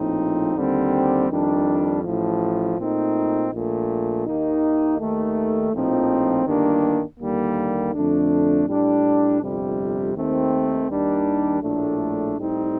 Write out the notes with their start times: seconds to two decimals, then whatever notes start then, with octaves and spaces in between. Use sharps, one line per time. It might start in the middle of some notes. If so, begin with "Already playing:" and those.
Already playing: A#1 A2 F3 C4 D#4
0.55 D#2 D3 G3 C4
1.30 F2 D#3 G3 D4
2.04 A1 A2 F3
2.77 A#2 A3 C4 D#4
3.50 A#1 A#2 A3
4.25 D#2 D#3 A#3 D#4
4.98 D#2 D#3 A3
5.72 A#1 A2 F3 C4 D#4
6.46 G1 G2 D#3 A#3 D4
7.19 D#2 D3 G3 A#3
7.93 F2 D3 A3 D4
8.67 A2 G3 D4
9.41 G1 F2 C3 G3
10.15 D#2 D#3 A3 C4
10.89 D#2 D#3 G3 D4
11.62 A#1 A2 A3 D4
12.37 A2 G3 C4 D#4